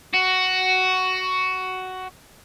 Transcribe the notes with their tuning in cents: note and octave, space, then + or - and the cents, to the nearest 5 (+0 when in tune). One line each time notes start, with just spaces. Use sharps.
F#4 +10